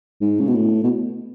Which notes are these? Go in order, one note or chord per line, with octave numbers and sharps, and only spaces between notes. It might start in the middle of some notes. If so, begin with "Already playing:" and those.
G#2
C#3
B2
A2
B2